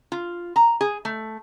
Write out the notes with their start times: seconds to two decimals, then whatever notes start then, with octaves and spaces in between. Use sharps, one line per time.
0.12 F4
0.56 A#5
0.81 G#4
1.05 A3